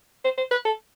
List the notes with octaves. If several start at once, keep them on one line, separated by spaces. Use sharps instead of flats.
C5
C5
B4
A4